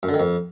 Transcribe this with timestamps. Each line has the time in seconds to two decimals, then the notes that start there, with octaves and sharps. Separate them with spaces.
0.03 F#2
0.09 D3
0.14 D#3
0.20 F2